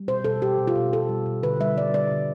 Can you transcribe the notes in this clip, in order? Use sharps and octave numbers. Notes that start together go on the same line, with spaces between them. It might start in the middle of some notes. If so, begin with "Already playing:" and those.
Already playing: G3
B2 C5
B2 A4
B2 G4
B2
F4
B2
B2 A4
G3
B2
D3 B4
G3 E5
G3 D5
D3 D5
D3